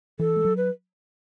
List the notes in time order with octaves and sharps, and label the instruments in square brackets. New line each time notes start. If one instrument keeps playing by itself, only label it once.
[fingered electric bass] E3 [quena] A4
[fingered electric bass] G#3
F#3
[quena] B4